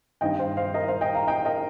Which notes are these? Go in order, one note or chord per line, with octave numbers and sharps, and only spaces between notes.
G2 D#3 C4 D#4 D#5 G5
C5 F5
C5 F5
A#4 D#5
C5 F5
D#5 G5
F5 A#5
D#5 G5
A#4 D#5